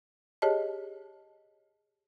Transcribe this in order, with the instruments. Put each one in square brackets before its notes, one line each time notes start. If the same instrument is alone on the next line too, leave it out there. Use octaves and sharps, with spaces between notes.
[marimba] G4 G#4 C#5 D#5 A5